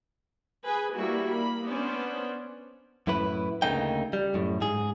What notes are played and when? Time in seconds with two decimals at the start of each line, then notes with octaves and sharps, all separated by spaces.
0.64 G#4 B4 G#5
0.95 G3 A#3 E4 F#4
1.28 A#3 B5
1.68 B3 C#4 D4 C5 D5
3.07 F#2 A2 E4 B4
3.62 D2 C#3 A3 A#3 D#4 G5
4.13 G3
4.34 F#2 A2
4.61 G#2 G#4